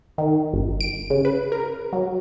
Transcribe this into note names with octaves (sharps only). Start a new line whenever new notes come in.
D#3
G1
D7
C#3
B4
A#4
F#3